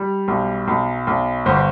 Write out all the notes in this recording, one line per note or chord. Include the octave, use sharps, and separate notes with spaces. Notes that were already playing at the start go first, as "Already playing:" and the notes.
Already playing: G3
B1
B1
B1
G1 C5